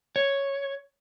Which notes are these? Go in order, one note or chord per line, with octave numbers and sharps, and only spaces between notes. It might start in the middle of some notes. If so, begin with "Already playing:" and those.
C#5